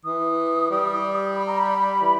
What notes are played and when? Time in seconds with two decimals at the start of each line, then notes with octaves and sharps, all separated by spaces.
0.05 E3 D#6
0.70 G3
1.35 B5
1.47 A#5
1.58 B5
2.01 E3